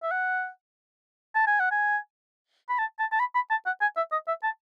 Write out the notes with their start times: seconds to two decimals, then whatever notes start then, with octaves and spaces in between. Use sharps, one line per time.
0.03 E5
0.12 F#5
1.35 A5
1.47 G#5
1.60 F#5
1.71 G#5
2.69 B5
2.79 A5
2.99 A5
3.12 A5
3.20 B5
3.35 B5
3.51 A5
3.66 F#5
3.82 G#5
3.97 E5
4.12 D#5
4.28 E5
4.43 A5